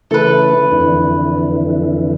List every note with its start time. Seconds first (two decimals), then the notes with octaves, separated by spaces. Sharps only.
0.11 C#3 E3 A3 A4 B4
0.71 F2 D3 E3